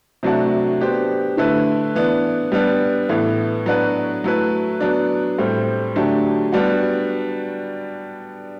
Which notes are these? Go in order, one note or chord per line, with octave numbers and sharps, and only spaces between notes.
C3 F#3 A3 D4 F#4
B3 D4 G4 C5
D3 A3 E4 B4
E3 B3 D4
G3 B3 D4
A2 E3 B3
F#3 B3 D4 F#4 B4
F#3 A3 E4 B4
F#3 B3 D4
A2 G3 C4
D3 F#3 A3 D4 G4
G3 B3 D4 F#4